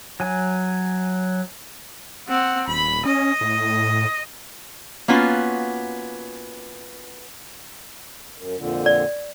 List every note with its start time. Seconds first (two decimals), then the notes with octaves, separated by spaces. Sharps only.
0.20 F#3 G#5
2.28 C4 F#5
2.68 D#1 B5
3.06 C#4 D#5
3.41 A2
5.08 A#3 B3 C#4 F4 F#4
8.36 F#2
8.57 F2 A#2 D3
8.86 D5